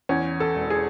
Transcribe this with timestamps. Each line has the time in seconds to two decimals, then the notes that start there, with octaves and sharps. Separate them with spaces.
0.09 E2 C#4
0.40 A4
0.56 E1
0.70 G#4